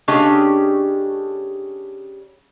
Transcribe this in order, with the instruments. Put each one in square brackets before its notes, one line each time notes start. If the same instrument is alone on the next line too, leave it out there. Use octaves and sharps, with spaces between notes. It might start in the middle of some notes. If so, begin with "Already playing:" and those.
[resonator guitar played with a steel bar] C#3 A3 C#4 D4 G4 D#5